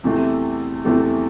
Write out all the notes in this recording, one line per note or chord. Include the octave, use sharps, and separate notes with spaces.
E2 C3 E3 A3 C4
E2 C3 E3 A3 C4